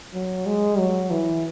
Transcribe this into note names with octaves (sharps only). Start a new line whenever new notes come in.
F#3
G#3
F#3
E3